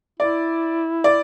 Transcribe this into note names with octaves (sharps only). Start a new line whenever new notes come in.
E4 D5
D5